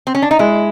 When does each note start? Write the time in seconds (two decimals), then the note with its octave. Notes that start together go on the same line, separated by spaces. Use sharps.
0.07 C4
0.15 C#4
0.22 D4
0.31 D#4
0.39 G#3 E4